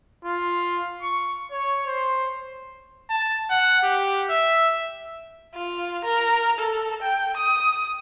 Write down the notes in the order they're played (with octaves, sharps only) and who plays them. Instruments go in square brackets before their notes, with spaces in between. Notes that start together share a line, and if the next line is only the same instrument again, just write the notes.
[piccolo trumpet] F4
C#6
C#5
C5
A5
F#5
G4
E5
[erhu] F4
A#4
A4
G5
D#6